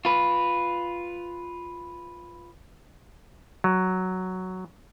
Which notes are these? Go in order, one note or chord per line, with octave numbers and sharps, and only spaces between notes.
F4 B4
F#3